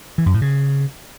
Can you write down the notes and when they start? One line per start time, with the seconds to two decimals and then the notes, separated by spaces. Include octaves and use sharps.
0.18 E3
0.26 F#2
0.34 A2
0.42 C#3